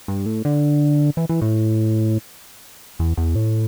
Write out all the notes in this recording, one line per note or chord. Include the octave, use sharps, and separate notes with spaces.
G2
A2
D3
E3
E3
A2
E2
E2
A2